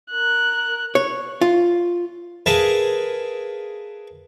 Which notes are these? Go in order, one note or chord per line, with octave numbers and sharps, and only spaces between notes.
A#4 F#6
C#5
F4
G#4 A#4 B4 E5 F5 A5